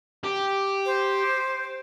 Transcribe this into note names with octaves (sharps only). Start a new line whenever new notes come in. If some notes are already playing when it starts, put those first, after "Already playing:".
G4
C5